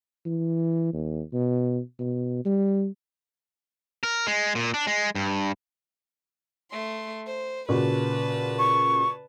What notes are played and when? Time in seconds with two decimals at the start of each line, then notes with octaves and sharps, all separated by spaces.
0.26 E3
0.93 D#2
1.33 B2
1.99 B2
2.45 G3
4.03 A#4
4.27 G#3
4.55 A#2
4.74 D4
4.87 G#3
5.15 G2
6.72 A3 C6
7.27 C5
7.69 A#2 C#3 F#4 B4 A5
8.59 C#6